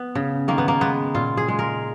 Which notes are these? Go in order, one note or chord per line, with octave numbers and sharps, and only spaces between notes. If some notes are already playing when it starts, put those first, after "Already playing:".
Already playing: B3
C#3
D#3 A#3
B3
A#3
G#3 B3
A#2 F4
G#4
G#3
A#4